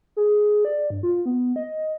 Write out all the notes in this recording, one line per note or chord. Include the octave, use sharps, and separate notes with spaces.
G#4
D5
G2
F4
B3
D#5